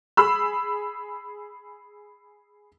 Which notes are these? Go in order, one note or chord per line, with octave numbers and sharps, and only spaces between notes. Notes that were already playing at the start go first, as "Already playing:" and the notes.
G#4 B5 E6